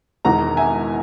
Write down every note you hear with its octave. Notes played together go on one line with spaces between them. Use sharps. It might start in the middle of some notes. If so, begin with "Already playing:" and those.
E1 E2 D#3 G#3 F#5 A#5
E5 G#5